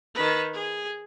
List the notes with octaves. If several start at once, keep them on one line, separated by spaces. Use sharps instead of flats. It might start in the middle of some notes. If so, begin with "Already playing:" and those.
D#3 B4
G#4